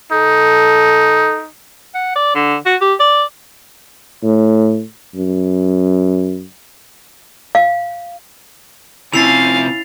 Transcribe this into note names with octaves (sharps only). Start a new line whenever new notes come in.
D#4 A4
F#5
D5
D3
F#4
G4
D5
A2
F#2
F5
C3 F3 C#4 E4 F5 A6 C7 F7